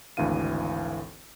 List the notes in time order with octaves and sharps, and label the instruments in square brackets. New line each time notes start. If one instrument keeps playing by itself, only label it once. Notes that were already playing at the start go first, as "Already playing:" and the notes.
[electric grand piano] G#1 D2 E3 D4 F5 D#7